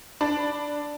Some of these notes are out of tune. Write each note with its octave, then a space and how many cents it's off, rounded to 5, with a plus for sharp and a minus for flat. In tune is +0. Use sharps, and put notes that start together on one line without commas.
D4 +0 D5 +0 B5 +0